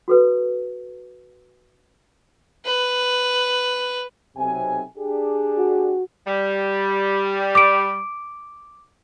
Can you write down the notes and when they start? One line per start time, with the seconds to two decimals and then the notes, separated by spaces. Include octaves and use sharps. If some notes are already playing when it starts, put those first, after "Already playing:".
0.08 F#4 A4 B4
2.66 B4
4.36 B1 C3 G#5
4.97 D4 G4 G#4
5.58 F#4
6.27 G3
7.55 D6 D7